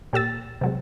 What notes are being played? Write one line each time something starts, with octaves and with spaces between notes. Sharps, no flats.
A#2 G4 E6 A6
C3 F#3 G#3